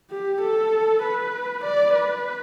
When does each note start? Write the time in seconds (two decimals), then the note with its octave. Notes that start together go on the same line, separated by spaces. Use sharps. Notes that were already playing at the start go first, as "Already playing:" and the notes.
0.11 G4
0.42 A4
1.03 B4
1.65 D5
1.95 B4